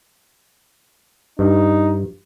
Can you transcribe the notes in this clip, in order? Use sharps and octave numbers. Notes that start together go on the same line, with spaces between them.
G2 D#4